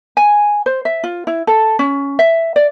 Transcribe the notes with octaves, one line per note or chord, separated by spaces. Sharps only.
G#5
C5
E5
F4
E4
A4
C#4
E5
D5